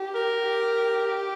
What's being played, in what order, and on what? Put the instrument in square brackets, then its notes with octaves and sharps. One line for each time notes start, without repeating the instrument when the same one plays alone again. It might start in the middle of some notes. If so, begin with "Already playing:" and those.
Already playing: [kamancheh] G4
[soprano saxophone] A#4
[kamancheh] G4